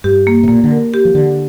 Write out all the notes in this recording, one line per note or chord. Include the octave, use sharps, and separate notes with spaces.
G2 G4
A#3
C3
A#2 A#3
D3
A#4
G4
F3
D3 G4